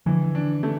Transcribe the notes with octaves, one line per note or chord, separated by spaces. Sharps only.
D3 E3 F3
D4
A3